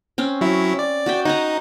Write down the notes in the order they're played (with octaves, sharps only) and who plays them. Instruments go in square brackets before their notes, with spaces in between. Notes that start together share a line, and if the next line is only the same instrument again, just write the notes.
[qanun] C4 C#4
[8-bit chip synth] F#3 E4
D5
[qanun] F#4 E5 G5
[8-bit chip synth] D#4 [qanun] F#5 G#5 A#5